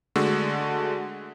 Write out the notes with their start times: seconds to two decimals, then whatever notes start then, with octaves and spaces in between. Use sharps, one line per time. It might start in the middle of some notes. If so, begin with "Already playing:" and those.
0.16 D3 G#3 A3 F#4